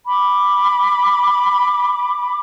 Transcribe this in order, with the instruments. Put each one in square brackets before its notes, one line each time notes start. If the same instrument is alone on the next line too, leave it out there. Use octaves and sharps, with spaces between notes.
[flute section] B5 D6